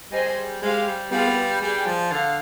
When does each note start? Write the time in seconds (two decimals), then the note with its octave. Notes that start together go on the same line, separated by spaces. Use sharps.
0.12 G3 G#4 C5 D#5 G#5
0.62 G#3 G4 C5 F5 G#5
0.87 G3
1.11 G3 B3 F4 G#4 B4 F5
1.61 G3 G#4 D5 G5
1.86 F3
2.11 D3 F5